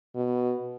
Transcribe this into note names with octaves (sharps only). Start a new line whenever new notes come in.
B2